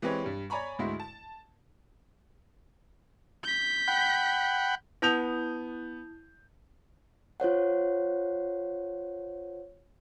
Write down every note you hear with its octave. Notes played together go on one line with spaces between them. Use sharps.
E3 G#3 C4 G4 B4 C#5
G2 G3
C#5 D5 G#5 A#5 B5 C#6
D2 G#2 G#3 E4 F#4 C6
A5
G6 B6
F#5 G5 B5
B3 E4 A5 D#6 G6 F7
F4 C5 C#5 F#5